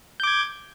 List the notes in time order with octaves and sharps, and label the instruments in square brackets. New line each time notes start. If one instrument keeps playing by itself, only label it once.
[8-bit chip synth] G6
D6
G#6